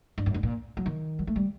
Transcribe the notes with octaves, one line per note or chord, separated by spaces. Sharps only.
G2
F#2
G2
A#2
F#3
D#3
F#3
A3
G3